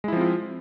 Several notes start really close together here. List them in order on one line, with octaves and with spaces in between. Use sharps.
G#3 E4 F3 C4 F4